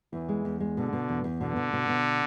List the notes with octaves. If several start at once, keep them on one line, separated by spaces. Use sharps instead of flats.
E2 E3
G#3
E2
G#3
B2 D3
B2
E2
E2
B2 D3
B2
B2
B2